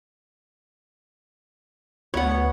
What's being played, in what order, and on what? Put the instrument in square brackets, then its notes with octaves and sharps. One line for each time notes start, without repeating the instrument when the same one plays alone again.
[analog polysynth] D2 B3 [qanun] C#5 F#5